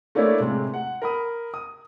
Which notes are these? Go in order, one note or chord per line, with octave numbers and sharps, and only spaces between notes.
A3 A#3 D4 E4 C#5 D5
A2 C3 G#3
F#5
A#4 B5 D#6
D#6